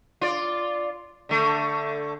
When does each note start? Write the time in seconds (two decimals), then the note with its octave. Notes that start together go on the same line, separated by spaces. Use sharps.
0.21 F4 D5
1.29 D3 A3